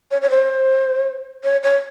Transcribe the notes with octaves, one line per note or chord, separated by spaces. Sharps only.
C#5
C#5
C5
C#5
C#5